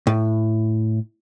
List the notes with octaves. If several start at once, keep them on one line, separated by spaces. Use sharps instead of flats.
A2